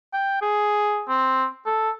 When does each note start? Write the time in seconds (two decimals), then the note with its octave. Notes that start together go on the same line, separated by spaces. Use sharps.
0.13 G5
0.42 G#4
1.09 C4
1.66 A4